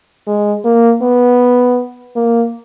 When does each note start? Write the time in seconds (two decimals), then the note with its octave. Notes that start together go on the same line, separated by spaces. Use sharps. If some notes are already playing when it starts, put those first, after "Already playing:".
0.27 G#3
0.65 A#3
1.02 B3
2.16 A#3